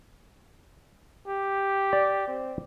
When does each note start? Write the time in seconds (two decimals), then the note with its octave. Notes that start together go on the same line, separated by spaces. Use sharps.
1.27 G4
1.93 D5
2.28 C4